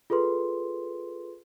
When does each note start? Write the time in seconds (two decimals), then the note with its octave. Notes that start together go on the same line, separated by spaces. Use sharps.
0.10 F4 G#4 A4 B4 C6